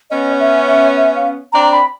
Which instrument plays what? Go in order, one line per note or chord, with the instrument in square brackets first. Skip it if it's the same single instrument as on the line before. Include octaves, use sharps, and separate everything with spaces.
[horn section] B3 C#4 [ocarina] D#5
[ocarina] E5
E5
E5
F5
[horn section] C4 D4 [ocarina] A#5
[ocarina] A#5
B5